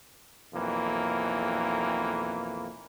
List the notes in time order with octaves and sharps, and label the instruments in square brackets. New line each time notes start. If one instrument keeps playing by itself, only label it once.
[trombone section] B1 F2 E3 A#3